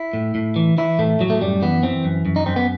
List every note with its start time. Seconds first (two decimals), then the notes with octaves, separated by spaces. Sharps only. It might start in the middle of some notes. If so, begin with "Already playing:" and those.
Already playing: E4
0.13 A2
0.35 A2
0.56 E3
0.78 E3 E4
0.99 A2 A3
1.20 A2 F#3
1.30 A3
1.41 F#2 G3
1.62 E3 B3
1.83 E3 C4
2.05 F#2
2.25 F#2
2.36 D#4
2.46 F#2 C4
2.56 B3